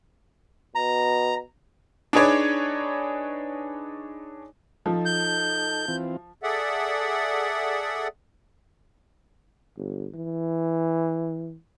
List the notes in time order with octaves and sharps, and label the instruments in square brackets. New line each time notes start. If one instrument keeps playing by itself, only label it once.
[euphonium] B2 [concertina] A#5
[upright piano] D4 D#4 G#4 B4 C#5 D5
[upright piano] F3 [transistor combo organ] D#4 A4
[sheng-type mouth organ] G6
[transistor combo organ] E3 C4 F4
[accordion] G#4 A4 D5 E5 F#5
[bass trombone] G1
E3